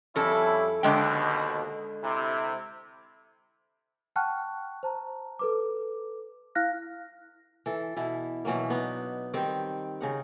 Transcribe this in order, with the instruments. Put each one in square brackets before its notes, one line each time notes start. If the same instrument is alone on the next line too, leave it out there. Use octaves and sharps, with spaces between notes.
[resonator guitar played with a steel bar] F2 A4 [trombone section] G3 C#4 E4
[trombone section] D#2 B2 [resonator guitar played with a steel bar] D3 G#3 G5
[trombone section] C3 E4
[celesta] F#5 G5 A5 C#6 F6 F#6
C5 A5 A#5
A4 B4 D6
E4 F5 F6 F#6 A#6
[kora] E3 A4
B2 E3 E4
B2 E3 F#3 A#3
B3 D4 D#4
D#3 G3 C4
C#3 D#4 F#5